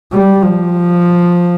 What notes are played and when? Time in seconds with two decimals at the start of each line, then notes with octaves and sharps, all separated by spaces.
0.13 G3
0.42 F3